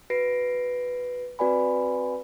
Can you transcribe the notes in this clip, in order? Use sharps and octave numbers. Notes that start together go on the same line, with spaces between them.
F#4 B4 A#6 C7 D7
C4 F#4 B4 D5 G#5 B5